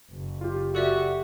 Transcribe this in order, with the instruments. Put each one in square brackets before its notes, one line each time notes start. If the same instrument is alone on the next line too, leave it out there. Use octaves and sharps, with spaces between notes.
[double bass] F#1
[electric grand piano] F4 G4
[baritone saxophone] F#4 [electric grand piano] G4 [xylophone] A4 D5 E5